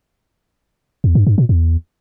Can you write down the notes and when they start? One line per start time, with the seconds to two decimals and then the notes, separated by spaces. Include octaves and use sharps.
1.04 E2
1.15 G2
1.27 G2
1.38 A#2
1.49 E2